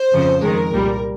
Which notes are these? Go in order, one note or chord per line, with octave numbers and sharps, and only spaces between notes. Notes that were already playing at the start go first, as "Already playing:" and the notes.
Already playing: C5
F2 C#3 F3
F2 D#3 G#3 A#4
C2 A#2 G3